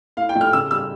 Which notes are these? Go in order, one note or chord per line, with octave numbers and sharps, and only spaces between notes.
A2 F5
G5
F3 A3
F6
C#3 E6
G3 E6